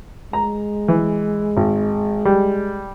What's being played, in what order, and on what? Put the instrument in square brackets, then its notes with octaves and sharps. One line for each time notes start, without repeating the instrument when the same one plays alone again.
[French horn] G#3 [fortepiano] A#5
[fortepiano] E3
G#1
G3